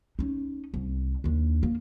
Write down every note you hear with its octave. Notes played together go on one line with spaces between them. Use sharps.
C#4 D#4
C2
D#2 D4
A#3 F4